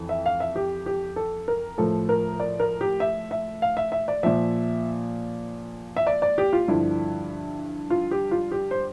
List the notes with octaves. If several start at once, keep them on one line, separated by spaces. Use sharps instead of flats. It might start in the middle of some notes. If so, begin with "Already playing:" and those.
Already playing: F2 E3
E5
F5
E5
G4
G4
A4
A#4
A2 F3 A4
A#4
D5
A#4
G4
E5
E5
F5
E5
E5
D5
A#2 F3 E5
E5
D5
D5
G4
F4
G2 D3 F3 E4
F4
G4
F4
G4
C5